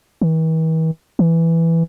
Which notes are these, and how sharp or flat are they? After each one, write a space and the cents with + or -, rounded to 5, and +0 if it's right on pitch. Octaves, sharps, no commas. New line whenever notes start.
E3 -45
E3 +5